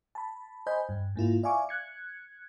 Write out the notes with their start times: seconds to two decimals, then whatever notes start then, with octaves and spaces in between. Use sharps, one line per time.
0.15 A5 B5
0.66 C5 D#5 G#5 B5 G6
0.89 G2
1.16 G#2 A#3 E4 F4
1.43 D5 E5 F5 G#5 C#6 D6
1.69 F#6 G#6 C#7